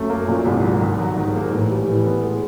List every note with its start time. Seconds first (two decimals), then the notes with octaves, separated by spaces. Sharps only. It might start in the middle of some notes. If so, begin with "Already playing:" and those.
Already playing: F#2 A3
0.09 A#3
0.28 A#2
0.45 C2 G#2
0.63 F#3
0.81 G2 D#3
0.99 F#3
1.17 G#2 D#3
1.35 A#3
1.52 A2 E3
1.70 G3
1.88 A2 E3
2.06 B3
2.23 G#3